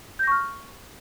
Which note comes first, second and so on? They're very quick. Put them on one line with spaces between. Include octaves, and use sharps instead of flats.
G6 A#6 C#6 F6